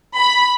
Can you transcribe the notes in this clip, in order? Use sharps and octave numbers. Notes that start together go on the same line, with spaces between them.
B5